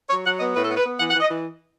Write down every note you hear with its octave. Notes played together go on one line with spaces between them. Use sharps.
F#3 C#5
F#3 F#5
B3 D#5
A2 B4
A4
B3
B4
B3
E3 F#5
F#5
E3
D#5
E3